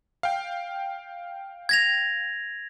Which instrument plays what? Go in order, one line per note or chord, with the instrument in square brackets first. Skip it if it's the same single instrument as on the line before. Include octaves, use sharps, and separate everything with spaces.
[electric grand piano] F5 G5
[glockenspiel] G#6 A#6 F7